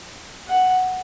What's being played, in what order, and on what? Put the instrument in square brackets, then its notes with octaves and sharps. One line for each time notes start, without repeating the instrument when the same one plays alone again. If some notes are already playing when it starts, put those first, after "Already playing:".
[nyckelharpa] F#5